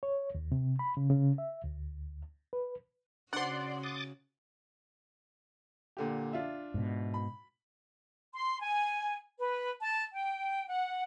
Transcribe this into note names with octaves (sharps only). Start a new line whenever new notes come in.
C#5
D#2
C3
B5
C#3
C#3
E5
D2
B4
C#3 D4 F#4 C5 D5 F#5 C6
D6 D#6 A6
A#2 D3 G4
D4 F4 E5
G#2 B2
B5
C6
G#5
B4
A5
G5
F#5